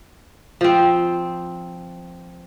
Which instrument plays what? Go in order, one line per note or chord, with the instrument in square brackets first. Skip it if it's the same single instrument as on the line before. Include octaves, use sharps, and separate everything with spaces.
[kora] F3 C4